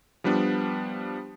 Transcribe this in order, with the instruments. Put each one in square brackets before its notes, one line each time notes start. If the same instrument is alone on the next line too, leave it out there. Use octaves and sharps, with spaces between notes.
[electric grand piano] F3 G3 B3 D4